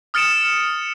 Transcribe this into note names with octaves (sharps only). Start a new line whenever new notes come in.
D#6 F6 A6 C#7 D7 E7